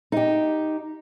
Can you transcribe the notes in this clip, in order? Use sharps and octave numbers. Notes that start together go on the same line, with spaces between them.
D#4 G4